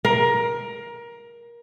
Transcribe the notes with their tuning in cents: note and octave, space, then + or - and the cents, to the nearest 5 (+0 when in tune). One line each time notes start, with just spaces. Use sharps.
A#4 +20